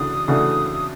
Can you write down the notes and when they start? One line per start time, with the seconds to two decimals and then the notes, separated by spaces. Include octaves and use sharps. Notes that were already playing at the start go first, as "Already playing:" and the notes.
Already playing: C#3 E3 A3 D4 F#4 D#6
0.28 C#3 E3 A3 D4 F#4